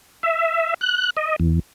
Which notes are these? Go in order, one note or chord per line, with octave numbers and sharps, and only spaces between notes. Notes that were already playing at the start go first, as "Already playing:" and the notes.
E5
F#6
D#5
E2